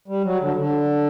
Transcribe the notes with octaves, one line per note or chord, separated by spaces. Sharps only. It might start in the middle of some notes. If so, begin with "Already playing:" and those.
G3
F#3
D3
D3